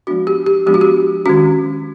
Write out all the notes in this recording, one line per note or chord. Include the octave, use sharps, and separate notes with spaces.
F3 G#3 B3 D4 F#4
G4
G4
F3 G#3 B3 D4 G4
F#4
G4
D#3 G#3 C#4 F#4